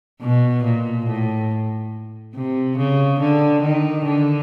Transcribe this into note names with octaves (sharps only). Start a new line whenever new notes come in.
B2
A#2
A2
C3
C#3
D3
D#3
D3